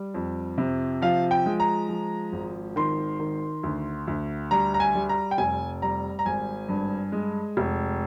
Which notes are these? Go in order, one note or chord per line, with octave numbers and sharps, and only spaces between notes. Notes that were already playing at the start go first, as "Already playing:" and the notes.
Already playing: G3
F2
C3
F3 F5
G5
G#3
A#5
F3
G#1
D#3 C6
D#3
D2
D2
G3 A#5
A#5
G#5
G3
A#5
G5
F1 G#5
G3 A#5
A#5
G#1 G#5
G2
G#3
F1